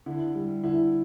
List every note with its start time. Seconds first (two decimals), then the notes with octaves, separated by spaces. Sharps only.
0.06 D3 E4
0.35 G3
0.63 D3 E4